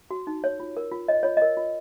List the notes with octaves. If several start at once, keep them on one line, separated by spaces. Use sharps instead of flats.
F#4
D#4
C#5
F4
A#4
F4
C#5 D#5
F4 C#5
A#4 D#5
F4